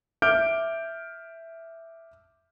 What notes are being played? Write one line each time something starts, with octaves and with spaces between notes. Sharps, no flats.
E5 D6 F6 G6 D7